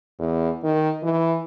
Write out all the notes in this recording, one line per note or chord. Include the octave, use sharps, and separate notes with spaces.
E2
D#3
E3